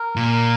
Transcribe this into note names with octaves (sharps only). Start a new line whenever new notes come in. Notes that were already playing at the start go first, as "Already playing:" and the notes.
Already playing: A#4
A#2